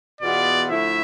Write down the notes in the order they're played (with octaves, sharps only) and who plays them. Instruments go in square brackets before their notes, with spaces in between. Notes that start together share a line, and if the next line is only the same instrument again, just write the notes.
[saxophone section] E2 B2 B3 F4 [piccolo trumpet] D5
[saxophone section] D3 F3 A3 E4 [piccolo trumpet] E5